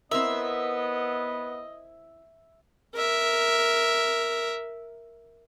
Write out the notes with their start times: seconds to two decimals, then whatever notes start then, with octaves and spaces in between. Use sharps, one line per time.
0.11 B3 C4 E4 A#4 D#5 E5
2.95 A#4 E5